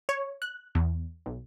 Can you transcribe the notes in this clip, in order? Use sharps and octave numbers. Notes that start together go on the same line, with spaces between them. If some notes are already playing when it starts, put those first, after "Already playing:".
C#5
F#6
E2
B1